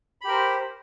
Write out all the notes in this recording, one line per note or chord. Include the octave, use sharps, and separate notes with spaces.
G4 A#4 C5 B5